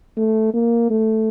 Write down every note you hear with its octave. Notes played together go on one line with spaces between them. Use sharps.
A3
A#3
A3